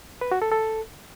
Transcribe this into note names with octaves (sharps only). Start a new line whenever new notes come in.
B4
F#4
A4
A4